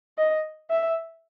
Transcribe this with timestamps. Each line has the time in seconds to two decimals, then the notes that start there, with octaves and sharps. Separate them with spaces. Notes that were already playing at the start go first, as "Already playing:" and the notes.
0.18 D#5
0.70 E5